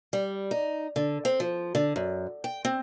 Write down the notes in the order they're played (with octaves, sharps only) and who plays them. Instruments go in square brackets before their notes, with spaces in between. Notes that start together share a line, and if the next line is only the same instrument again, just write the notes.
[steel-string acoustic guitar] G3
D#4
D3
C4
F3
D3
F#2
G5
C4